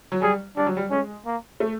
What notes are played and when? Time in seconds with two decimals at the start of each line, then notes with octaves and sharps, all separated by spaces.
0.12 F#3
0.22 G3 G#4
0.57 G3 D4
0.66 F#3
0.77 G3
0.91 G#3 C#4
1.26 A#3
1.60 A3